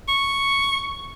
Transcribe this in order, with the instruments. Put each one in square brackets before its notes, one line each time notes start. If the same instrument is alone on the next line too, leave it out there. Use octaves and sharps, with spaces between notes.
[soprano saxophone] C#6